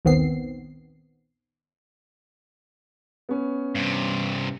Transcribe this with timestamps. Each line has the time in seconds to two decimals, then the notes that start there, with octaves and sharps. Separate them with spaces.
0.05 A#1 D#2 D#3 B3 C4 C7
3.29 B3 C#4
3.75 G2 C3